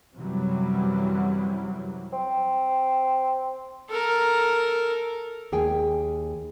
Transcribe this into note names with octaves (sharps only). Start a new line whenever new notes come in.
F#2 C3 E3 F#3 G3
C4
A4 A#4
D#2 G#4 G5 G#5